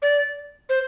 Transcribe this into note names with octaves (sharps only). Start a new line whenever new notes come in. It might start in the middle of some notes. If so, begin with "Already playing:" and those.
D5
C5